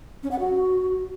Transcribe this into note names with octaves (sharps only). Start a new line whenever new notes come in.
C#4
F#5
F#4